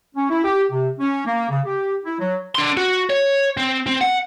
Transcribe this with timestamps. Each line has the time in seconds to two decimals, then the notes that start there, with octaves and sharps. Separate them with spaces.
0.15 C#4
0.30 E4
0.44 G4
0.71 C3
0.99 C#4
1.26 A#3
1.50 C#3
1.66 G4
2.05 E4
2.19 F#3
2.55 D4 C6
2.77 F#4
3.10 C#5
3.57 C4
3.86 C4
4.01 F#5